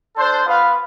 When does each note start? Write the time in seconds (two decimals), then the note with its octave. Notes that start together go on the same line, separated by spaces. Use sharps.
0.16 D4 A4 C5
0.44 B3 F4 B4 F5